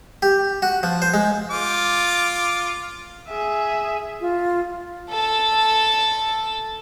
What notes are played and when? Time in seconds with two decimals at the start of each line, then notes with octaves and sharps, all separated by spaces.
0.22 G4
0.62 F#4
0.83 F3
1.02 C5
1.14 G#3
1.51 F4 D6
3.28 G#4 E5
4.21 F4
5.10 A4 A5